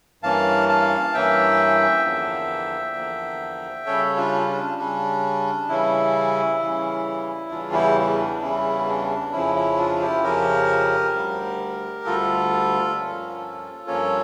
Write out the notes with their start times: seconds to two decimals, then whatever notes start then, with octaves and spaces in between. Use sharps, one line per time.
0.22 G2 E3 A#3 C#4 F5 A5
0.69 F5 A5
1.14 G2 E3 A#3 C#4 E5 G5
2.05 E2 D3 F3 A#3
2.96 E2 D3 F3 A#3
3.86 C#3 G3 C#4 A4 C#5
4.17 D4 F4
4.47 D4
4.78 C#3 G3 C#4 D4
5.69 C#3 E3 G3 C#4 E4
6.59 C#3 E3 G3 C#4
7.51 E2 C#3 E3 G3 C#4 D4 F4
7.73 E4 G4
8.19 D4
8.41 E2 C#3 E3 G3 C#4 E4
8.87 D4
9.33 F2 C#3 F3 C#4 E4
9.55 E4
9.77 D4 F4
10.00 E4 G4
10.23 F2 C#3 F3 C#4 G4 A#4
11.14 D2 D3 G3
12.05 D2 D3 G3 F4 A4
12.96 G2 F3 A#3 C#4
13.87 G2 F3 A#3 C#4 A4 C#5